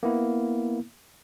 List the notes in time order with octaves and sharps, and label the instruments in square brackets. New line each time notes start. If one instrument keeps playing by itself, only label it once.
[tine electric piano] A#3 B3 E4